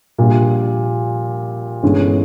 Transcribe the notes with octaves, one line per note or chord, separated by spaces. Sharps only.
A#1 A#2 G3
G1 G2 E3 G#3 C#4